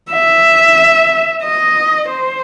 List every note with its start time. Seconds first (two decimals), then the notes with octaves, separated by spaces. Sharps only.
0.12 E5
1.44 D#5
2.09 C5